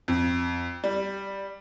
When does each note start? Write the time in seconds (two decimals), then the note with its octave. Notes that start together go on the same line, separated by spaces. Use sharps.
0.08 F2
0.84 G3